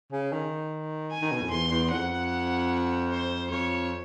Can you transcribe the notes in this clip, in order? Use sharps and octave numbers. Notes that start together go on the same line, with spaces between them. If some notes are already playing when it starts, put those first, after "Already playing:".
C#3
D#3
G#5
D#3
B2
F2
E2 C6
E2
F2 F#5
C5
F2 C#5